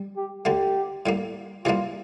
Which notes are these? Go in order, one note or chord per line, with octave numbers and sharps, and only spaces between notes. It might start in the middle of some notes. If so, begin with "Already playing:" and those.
Already playing: G3
G4
D2 D3 A3 G4
A2 G3 A#3
E2 C3 E3 G3 A#3 F4